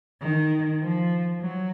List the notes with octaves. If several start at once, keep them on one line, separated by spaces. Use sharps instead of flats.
D#3
F3
F#3